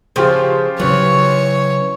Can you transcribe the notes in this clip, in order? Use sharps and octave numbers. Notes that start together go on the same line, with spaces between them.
C#3 F3 F4 G4 C5
C#3 E3 F#3 C#5